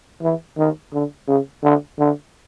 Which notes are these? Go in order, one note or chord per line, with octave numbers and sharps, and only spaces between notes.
E3
D#3
D3
C#3
D3
D3